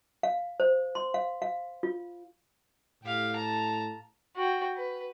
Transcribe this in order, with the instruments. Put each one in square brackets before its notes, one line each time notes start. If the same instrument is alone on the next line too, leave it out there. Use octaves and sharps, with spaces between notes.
[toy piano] F5
C5
C6
F5
F5
F4
[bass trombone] A2 [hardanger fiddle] G4 F5
[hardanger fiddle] A5 A#5
F#4 G5
B4